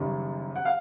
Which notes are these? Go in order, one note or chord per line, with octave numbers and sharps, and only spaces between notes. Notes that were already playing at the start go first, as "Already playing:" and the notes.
Already playing: F#1 F#2 D#3 G3
F#5
F5